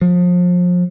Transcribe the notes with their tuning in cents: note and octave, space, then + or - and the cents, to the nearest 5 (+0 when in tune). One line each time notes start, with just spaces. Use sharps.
F3 +30